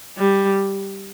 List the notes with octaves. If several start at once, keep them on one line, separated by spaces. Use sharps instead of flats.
G3